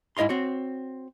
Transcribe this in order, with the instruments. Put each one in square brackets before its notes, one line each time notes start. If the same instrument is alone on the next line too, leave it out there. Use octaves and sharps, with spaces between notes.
[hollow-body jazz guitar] G#2 E4 D#5 F5 C6
C4 F#4 C#5